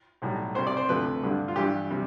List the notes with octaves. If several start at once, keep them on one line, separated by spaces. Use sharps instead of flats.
B1 A2 G3
C2 C3 G3 C5
D5
C5
D2 C3 F3 A3 B4
G2 D3 G3
F4
G2 E3 G3 G4
C3 G3